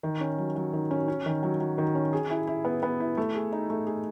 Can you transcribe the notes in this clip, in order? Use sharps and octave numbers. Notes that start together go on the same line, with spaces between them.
D#3
C#4
F#3
F#3
D#3
C#4
C#4
D#3
F#3
F#3
D#3
C#4
G#4
E4
E4
B3
B3
E4
A3
G#4
D#4
A3
G#4